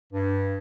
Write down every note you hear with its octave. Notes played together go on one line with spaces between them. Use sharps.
G2